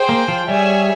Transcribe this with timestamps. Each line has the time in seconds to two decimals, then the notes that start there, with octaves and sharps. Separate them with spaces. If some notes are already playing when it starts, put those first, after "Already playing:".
Already playing: G#4 C5 G5
0.09 A#3
0.28 F3
0.48 G3 G#4 C#5 E5 G#5